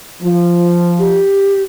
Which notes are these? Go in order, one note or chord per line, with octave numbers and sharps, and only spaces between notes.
F3
G4